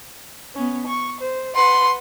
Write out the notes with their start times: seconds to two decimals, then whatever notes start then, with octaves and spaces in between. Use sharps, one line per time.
0.54 B3 C#4
0.86 C#6
1.20 C5
1.55 B4 F#5 C6